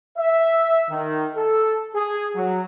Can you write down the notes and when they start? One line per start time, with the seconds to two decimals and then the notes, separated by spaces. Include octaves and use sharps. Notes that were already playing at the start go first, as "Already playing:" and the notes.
0.18 E5
0.90 D#3
1.35 A4
1.95 G#4
2.35 F#3